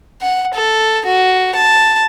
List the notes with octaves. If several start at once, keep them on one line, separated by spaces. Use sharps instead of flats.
F#5
A4
F#4
A5